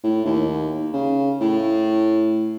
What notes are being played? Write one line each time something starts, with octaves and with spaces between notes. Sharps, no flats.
A2
D#2
C#3
A2